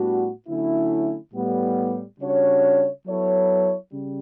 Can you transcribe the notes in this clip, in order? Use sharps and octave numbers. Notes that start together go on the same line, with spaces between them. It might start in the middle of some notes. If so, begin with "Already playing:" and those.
Already playing: A2 G3 B3 D4 F#4
D3 F#3 A3 C#4 E4
A2 G3 B3
C#3 G3 D4 F#4 C#5
F#3 B3 E4 A4 C#5
C#3 G3